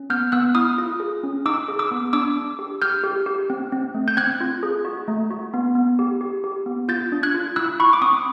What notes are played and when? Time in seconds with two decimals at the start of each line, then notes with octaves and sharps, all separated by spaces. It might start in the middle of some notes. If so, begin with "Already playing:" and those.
Already playing: C#4
0.10 B3 F6 G6
0.32 B3 E6 F#6
0.55 E4 D#6 F6
0.78 F4
1.00 G#4
1.23 C#4
1.46 D#4 D6 E6
1.68 G#4
1.79 D6 E6
1.91 B3
2.13 D4 D6 E6
2.37 D4
2.59 G4
2.81 G4 F6 G6
3.04 G4
3.26 G4
3.50 C4
3.72 C4
3.94 A3
4.08 G6
4.17 C4 F#6 G#6
4.41 F4
4.63 G#4
4.85 F#4
5.08 A3
5.31 F#4
5.54 B3
5.75 B3
5.99 G4
6.21 G4
6.44 G4
6.66 B3
6.88 F4 G6 A6
7.12 D4
7.23 F#6 G#6
7.34 F4
7.56 E4 E6 F#6
7.79 E4 B5 C#6
7.93 D6
8.02 C4 C#6 D#6